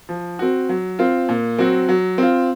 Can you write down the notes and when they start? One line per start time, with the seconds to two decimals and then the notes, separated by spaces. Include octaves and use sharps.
0.09 F3
0.39 C4 F#4
0.69 F#3
0.99 C4 F4
1.29 A#2
1.59 F#3 C4 F#4
1.89 F#3
2.18 C4 F4